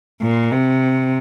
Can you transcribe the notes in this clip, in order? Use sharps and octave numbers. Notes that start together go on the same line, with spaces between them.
A#2
C3